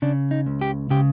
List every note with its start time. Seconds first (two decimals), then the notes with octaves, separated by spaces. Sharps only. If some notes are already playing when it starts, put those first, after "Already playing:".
0.02 C#3 D4
0.31 D#4
0.46 C#2
0.61 G4
0.90 C#3 G4